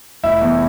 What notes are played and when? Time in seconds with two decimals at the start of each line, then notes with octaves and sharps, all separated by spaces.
0.23 F1 E4
0.41 E2